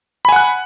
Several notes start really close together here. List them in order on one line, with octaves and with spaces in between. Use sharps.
B5 G#5 F#5 F#6